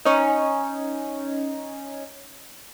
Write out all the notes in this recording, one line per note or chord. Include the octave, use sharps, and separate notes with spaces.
C#4 D#4